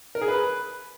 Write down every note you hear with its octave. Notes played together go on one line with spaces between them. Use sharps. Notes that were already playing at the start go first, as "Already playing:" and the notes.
A#4
G#4
B4